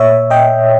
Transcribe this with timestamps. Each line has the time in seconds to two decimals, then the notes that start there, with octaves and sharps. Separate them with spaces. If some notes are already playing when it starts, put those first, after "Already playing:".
Already playing: A#2 C#5 E5
0.30 D#5 G5